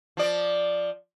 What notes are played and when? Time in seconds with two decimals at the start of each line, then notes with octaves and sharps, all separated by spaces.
0.17 F3 D5